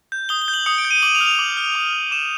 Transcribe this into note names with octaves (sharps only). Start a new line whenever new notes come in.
G6
D#6 G7
G7
G6
F#7
D#6 C#7
D7
G6
D#7
D6 F#7
F7
F6
F7
D6 F#7
F6
D6 F7
F6
D6 E7